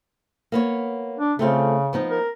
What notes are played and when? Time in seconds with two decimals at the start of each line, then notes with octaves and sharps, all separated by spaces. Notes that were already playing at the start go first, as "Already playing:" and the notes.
0.52 A#3 B3 C#5
1.19 D4
1.39 C#3 A3 C4 F4
1.93 F3 B3 D#4
2.10 A#4